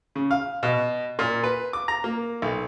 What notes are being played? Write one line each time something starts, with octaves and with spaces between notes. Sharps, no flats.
C#3
F5
B2
A#2
B4
D6
A#5
A#3
B1